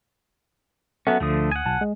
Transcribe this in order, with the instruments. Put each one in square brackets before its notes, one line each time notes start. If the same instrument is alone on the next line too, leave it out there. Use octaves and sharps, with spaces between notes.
[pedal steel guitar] F#3 B3 C#4 [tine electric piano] A4 E5 F#5
[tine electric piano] D2 D#6 [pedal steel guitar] D3 F3 A3
[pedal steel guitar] F#5 G#5
[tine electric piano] B1 A5
G#3